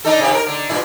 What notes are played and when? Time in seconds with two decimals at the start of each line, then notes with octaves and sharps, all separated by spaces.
0.05 D4 D#4 A4
0.19 C3 B3 G4
0.31 A4 A#4
0.46 D3
0.69 G2 A#2 E4